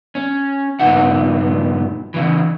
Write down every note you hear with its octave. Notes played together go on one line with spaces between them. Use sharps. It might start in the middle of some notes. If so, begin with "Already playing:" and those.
C#4
G2 A#2 C#3 B3 D#4 F#5
C#3 E3